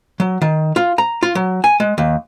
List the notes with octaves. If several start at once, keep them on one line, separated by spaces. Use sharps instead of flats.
F#3
D#3
F4
A#5
F4
F#3
G#5
G#3
D#2